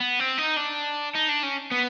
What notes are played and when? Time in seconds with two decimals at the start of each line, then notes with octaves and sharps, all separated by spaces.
0.01 B3
0.20 C4
0.38 D#4
0.57 D4
1.15 D#4
1.29 D4
1.43 C#4
1.71 B3